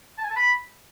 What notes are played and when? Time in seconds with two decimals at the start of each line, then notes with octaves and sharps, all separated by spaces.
0.18 A5
0.24 G#5
0.30 A5
0.36 B5